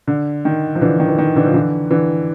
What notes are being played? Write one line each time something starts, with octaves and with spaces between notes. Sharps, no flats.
D3
D#3
F3
D3 E3
D#3
E3
D#3
D3 E3
F3
D3 E3
D3 E3